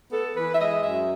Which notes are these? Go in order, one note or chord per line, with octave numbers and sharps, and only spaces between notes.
B3 A4
E3 B4
E5
G#3 D#5
F#2 E5